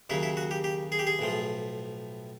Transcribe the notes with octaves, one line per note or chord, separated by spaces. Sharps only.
D#2 C#3 F#3 E4
E4
F#4
G4
G4
G#4
G4
G#4
B1 A2 F3